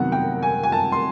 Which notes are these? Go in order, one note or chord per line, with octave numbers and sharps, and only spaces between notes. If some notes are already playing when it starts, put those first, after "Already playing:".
Already playing: C3 D#3 F#3 B3 F#5
G5
G#5
G#5
A5
C6